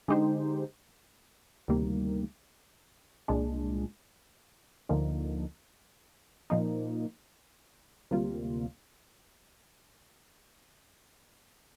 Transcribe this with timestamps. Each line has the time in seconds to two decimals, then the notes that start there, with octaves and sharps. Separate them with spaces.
0.08 D3 G#3 D#4 G4 C5
1.68 D2 C3 D#3 G3 A#3
3.28 C2 A#2 G#3 D4
4.89 D2 D3 F3 A#3 D#4
6.50 A#2 F3 A#3 D#4
8.11 D2 C3 G3 A#3 F4